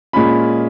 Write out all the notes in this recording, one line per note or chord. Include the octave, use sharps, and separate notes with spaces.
A#2 G#3 C#4 F4 B5